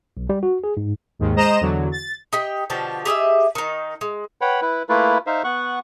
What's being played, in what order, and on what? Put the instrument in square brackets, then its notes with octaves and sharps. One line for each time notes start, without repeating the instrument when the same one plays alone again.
[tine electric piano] B1
G3
F#4
G#4
G#2
[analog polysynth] D#2 G#2 D#3
G#3 C5 D#5 A#5 E7
E2 D3 F#3
A6
[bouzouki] D#4 G4 G5
B2 D3 F3 G4
G4 G#4 D#5 E5
D#3 D#4
G#3
[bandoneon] B4 C#5 F#5 G5 B5
E4 B4
A3 A#3 E4 F4 B4
D#4 C5 E5 F5
B3 F#5 C#6 F#6